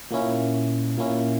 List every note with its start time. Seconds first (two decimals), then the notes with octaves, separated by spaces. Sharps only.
0.11 A#2 A#3 C#4 E4
0.97 A#2 A#3 C#4 E4